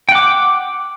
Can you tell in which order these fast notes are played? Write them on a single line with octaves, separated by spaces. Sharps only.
G5 F#5 D6